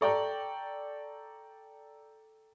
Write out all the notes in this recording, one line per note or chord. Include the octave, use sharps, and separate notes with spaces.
A4 D5 G5 A#5 C#6